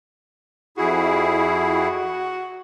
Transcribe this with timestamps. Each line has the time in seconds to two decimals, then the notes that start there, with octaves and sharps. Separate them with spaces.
0.78 F2 E4 F#4 G#4